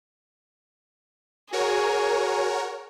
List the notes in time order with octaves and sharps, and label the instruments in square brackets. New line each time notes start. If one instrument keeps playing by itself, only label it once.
[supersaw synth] F#4 A#4 C#5 [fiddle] G#4